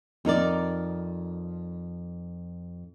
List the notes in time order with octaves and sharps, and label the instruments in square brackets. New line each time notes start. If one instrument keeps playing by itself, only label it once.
[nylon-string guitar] F2 D#4 A#4 D5